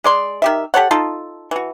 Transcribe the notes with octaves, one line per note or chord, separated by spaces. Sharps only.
G#3 D5 C6
D#3 G4 E5
G4 A4 C#5 F#5
D#4 F4 A4
E3 F#4